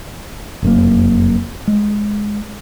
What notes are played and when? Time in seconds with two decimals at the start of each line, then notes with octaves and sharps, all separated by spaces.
0.62 F1 F#2 A#3
1.67 G#3